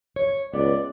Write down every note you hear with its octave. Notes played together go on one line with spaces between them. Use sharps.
C#5
C#2 B3 D5